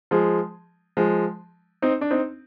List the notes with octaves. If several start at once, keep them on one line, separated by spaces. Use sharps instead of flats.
F3 G#3
F3 G#3
C4 D#4
D4
C4 D#4